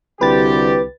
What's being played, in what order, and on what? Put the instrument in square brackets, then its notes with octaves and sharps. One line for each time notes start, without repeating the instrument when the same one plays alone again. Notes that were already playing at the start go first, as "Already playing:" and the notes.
[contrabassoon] C2 [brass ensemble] D3 F#4 G4 [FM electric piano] B4 A6